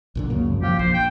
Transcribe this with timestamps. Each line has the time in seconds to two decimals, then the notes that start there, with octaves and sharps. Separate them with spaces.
0.15 A#1 A#2 D3
0.30 C#2 F#2 C#3 A#3
0.50 B1 F2 G#2
0.63 F3 G4 F5
0.79 A#1 C5
0.94 G5